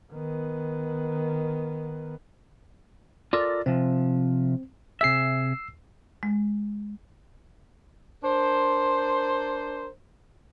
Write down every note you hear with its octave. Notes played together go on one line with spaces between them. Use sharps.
D#3 B3
F4 A4 A#4 D5
C3 F3 C4
C3 G#4 E5 E6 C7
G#3
D4 A#4 C5